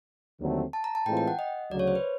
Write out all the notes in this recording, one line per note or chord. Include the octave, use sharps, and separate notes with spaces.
D#2 D3 F#3 A3 C4
A5
A#5
A5
A2 E3 G#3 C4 F4 G5
G5
F#5
D#5
D2 C#3 F#3 D5
C#5
C5
B4